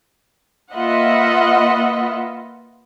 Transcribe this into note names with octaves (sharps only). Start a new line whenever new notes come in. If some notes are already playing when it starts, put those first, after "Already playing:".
A#3 F4 B4 D#5 E5 F#5